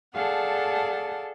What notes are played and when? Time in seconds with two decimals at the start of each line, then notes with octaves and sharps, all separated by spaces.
0.14 G#4 A4 D5 F5 F#5 A5